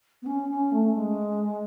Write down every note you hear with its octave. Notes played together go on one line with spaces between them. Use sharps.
B3
C#4
C#4
A3
G#3